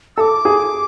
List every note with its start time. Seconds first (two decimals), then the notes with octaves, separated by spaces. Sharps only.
0.16 A4 D6 E6
0.45 G#4